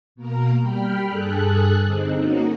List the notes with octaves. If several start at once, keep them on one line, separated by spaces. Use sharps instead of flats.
B2 A#3 A#4 A#5
G3 G5 B5 F6
G2 G#4 A4 F#6
D3 C4 D#4
A#3 C#4 D#4 F#4